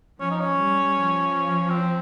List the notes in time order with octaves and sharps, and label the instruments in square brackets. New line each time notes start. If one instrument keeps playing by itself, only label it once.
[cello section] F3 [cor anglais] C#4
[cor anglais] D#4
C#4
[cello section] G3
F3
[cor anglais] C4